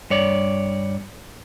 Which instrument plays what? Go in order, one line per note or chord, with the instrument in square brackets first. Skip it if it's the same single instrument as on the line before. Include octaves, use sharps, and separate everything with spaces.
[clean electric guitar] G2 C#5 D5